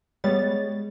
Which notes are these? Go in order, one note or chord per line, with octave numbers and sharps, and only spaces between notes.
G3 G#3 B3 C#5 A6